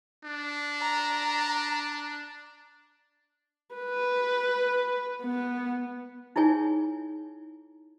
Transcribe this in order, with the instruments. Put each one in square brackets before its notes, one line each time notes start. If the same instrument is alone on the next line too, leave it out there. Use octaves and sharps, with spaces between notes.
[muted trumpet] D4
[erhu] A#5
[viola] B4
B3
[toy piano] D#4 E4 G#4 C#5 G#5